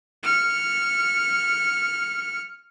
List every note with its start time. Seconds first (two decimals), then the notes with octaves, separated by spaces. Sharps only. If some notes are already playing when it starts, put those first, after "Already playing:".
0.23 F6 C#7